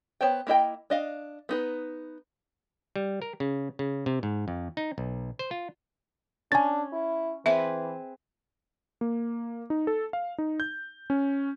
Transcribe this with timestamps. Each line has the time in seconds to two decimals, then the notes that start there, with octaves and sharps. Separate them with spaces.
0.21 B3 C5 C#5 G5
0.47 A#3 E4 D#5 G5
0.90 D4 D#5 F5
1.49 B3 D#4 B4
2.96 G3
3.22 A#4
3.40 C#3
3.79 C#3
4.06 C3
4.23 G#2
4.48 F2
4.77 D#4
4.98 B1
5.39 C5
5.51 F4
6.52 C#4 D4 G#5 A6
6.93 E4
7.46 E3 C4 G#4 B4 E5
9.01 A#3
9.70 D#4
9.87 A4
10.13 F5
10.38 D#4
10.60 G6
11.10 C#4